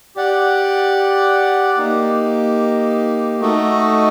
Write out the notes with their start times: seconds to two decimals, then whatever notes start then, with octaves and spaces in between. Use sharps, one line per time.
0.16 G4 D5 F#5
1.78 A#3 D#4 G4
3.41 A3 D#4 F#4 A4 D#5